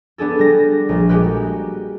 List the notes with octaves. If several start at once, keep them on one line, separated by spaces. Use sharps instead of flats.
B3 D4 G#4 A4
G3 A#6
A#1
G#3 F#4 G4 B4